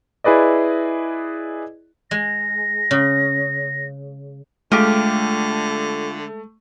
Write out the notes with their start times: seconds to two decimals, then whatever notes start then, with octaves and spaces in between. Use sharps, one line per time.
0.24 E4 G#4 B4 D5 D#5
2.11 G#3 A#6
2.91 C#3
4.72 D3 G#3 A3 F4 G4